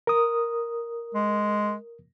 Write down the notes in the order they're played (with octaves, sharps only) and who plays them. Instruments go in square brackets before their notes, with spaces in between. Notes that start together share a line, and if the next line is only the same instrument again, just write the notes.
[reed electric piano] A#4 D#6
[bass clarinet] G#3